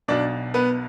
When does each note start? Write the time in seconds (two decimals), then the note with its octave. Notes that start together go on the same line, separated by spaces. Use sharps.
0.08 B1 B2 D4 D5
0.54 B3 B4